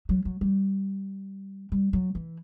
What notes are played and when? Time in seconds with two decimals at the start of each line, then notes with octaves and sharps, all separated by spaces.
0.09 F#3
0.25 F#3
0.41 G3
1.72 G3
1.93 F#3
2.15 E3